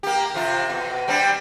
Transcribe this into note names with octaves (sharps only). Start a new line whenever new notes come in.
A#3 G4
F2 C3 F4
B2
G3 C4 D4